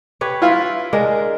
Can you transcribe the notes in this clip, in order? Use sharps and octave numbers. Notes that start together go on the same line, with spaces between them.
G4 B4 C#5
E4 F4
G#3 D4 A#4